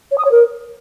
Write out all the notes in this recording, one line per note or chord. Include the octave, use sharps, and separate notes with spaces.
C#5
D#6
C#5
A#4